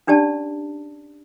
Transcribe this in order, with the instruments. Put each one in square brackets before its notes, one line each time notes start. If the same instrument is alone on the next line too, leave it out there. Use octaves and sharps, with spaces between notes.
[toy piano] C#4 D4 G4 D5 A5